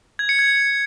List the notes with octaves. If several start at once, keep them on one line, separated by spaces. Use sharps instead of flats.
G#6
C#7
G#6